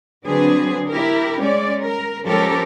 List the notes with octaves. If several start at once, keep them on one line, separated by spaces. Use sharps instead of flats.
D3 F#3 C4 D4 G#4 B4
E4 G4 A#4
G#3 C#4 D5
A#4
F3 G#3 C#4 G4 A4 A#4